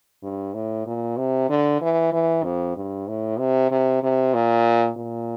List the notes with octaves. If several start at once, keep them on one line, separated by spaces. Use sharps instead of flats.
G2
A2
A#2
C3
D3
E3
E3
F2
G2
A2
C3
C3
C3
A#2
A#2